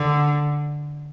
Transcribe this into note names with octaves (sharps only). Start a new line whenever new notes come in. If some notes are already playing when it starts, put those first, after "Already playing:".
Already playing: D3